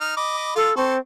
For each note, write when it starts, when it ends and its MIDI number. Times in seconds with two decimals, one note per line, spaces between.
0.01 0.15 63
0.01 0.15 89
0.17 0.53 75
0.17 0.53 83
0.17 0.53 86
0.56 0.70 65
0.56 0.76 69
0.56 0.70 77
0.77 0.98 60
0.77 0.95 69
0.77 0.95 84
0.77 0.95 85